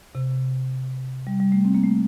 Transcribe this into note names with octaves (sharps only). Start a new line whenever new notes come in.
C3
G3
G3
A3
C4
A#3
A3